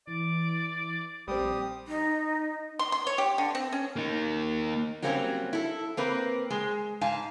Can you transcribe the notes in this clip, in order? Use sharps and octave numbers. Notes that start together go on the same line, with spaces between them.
E3 D5
A#1 G3 C4 G4 D#6
D#4
C6
C6
C#5
G4
D3
C4
C#4
A#3 D#4
F#3 G3 A#3 C4 C#4
E4 A4
A#3 C4 B4
G#3
G#2 F5 G#5 A5